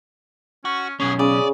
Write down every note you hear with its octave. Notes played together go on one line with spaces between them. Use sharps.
C#4 F#4
B1 F#2 C#4 G#4
C#3 D5 D#6